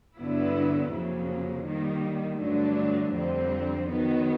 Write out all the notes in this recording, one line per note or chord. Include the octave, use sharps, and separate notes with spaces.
G2 D3 F#3 B3 E4
F2 C#3 F#3 A#3
D#3 G3 A#3
G2 D3 F#3 A3 D4
F2 D3 G3 C4
D#3 F#3 B3